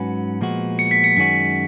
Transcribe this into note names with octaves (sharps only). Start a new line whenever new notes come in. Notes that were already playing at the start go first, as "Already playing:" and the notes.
Already playing: G#2 F#3 C#4 F#4 B4
A#2 F3 G#3 B3 F#4
C#7
B6
C#7
F#2 D#3 G#3 C#4 F#4 B6